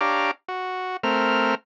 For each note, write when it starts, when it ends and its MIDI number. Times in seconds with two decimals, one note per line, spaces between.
0.01 0.31 62
0.01 0.31 67
0.01 0.31 73
0.01 0.31 77
0.01 0.31 82
0.01 0.31 86
0.48 0.97 66
1.03 1.55 57
1.03 1.55 60
1.03 1.55 70
1.03 1.55 89